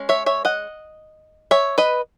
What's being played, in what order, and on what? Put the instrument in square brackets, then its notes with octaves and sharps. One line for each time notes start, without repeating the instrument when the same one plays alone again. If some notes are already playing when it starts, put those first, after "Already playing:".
Already playing: [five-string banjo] G#3 C#4
C#5 E5
C#5 E5
D#5 F#5
C#5 E5
B4 D#5